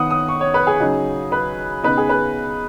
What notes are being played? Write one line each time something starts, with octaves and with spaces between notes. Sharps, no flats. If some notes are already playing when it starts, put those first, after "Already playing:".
Already playing: D#3 B3 D#4 F#5 D#6
D#6
C#6
C#5
B4
G#4
C#3 F#3 D#4
B4
C#3 B3 D#4 B4
G#4
B4